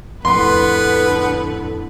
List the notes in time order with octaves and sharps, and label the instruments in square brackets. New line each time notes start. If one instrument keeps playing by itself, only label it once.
[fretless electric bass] F2 A2 [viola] D3 B4 [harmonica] B3 [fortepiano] C6